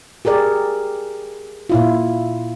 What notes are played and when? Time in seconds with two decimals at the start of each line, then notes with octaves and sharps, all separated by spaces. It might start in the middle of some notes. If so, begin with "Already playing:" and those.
0.25 G4 G#4 A#4 D5
1.70 A#2 E4 F4